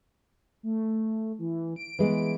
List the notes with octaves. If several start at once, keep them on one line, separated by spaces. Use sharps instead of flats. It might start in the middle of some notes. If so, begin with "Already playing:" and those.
A3
E3
D7
E3 G#3 B3